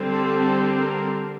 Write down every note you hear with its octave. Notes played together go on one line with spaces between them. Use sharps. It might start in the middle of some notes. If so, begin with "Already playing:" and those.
Already playing: D3 G3 C4
A4
A4
A#4